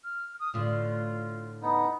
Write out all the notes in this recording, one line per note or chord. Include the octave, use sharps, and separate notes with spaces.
F6
D#6
A2 D3 F4
B3 D#4